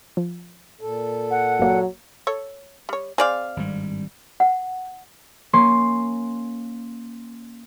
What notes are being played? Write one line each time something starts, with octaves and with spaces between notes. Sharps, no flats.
F3
A#2 A4
F#5
G1 F#3 A#3
A4 C#5
G3 C#5
C4 G#4 D5 F5
G#1 G2 G3
F#5
A#3 C#4 C6